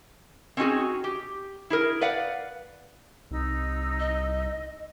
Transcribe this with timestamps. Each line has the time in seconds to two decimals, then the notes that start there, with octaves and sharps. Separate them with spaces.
0.57 C4 C#4 D#4 E4 F#4 G#4
1.04 G4
1.70 E4 G#4 A#4
2.01 B4 D5 F5 F#5
3.31 C2 D#4 E6
3.99 D#5